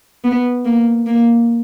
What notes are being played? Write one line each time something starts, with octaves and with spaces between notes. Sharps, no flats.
B3
A#3
A#3